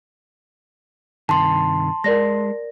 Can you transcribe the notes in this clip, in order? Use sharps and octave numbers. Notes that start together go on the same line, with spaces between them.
G2 C3 D#3 A5 C6
G#3 A#4 D5 A#6